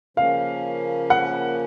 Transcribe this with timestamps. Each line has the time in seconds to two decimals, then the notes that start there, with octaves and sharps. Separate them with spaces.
0.17 C#3 F3 A#3 C#4 F5
1.10 F#5